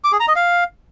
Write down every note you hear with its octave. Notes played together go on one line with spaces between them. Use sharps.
D6
G#4
A#5
D#5
F5